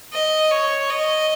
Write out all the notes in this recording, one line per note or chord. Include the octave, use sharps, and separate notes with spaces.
D#5
C#5
D#5